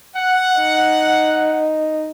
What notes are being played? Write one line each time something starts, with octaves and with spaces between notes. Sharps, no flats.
F#5
D#4